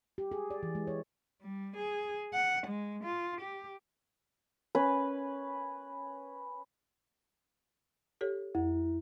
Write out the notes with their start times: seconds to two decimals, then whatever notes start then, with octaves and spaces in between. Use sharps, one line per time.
0.18 G4
0.32 G#4
0.50 D5
0.63 E3
0.75 G#3
0.87 C#5
1.43 G3
1.77 G#4
2.34 F#5
2.67 G#3
3.04 F4
3.41 G4
4.75 C#4 B4
8.21 G4 A4 C#5
8.55 F2 E4